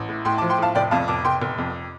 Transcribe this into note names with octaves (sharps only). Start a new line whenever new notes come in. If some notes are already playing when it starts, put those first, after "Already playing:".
Already playing: A1
A2
A2 G5 C6
A5 D6
F3
G5 C6
A2 F5 A5
F1 D5 G5
F2 F5 A5
F1 A5 D6
F1 G5 C6
F1
F2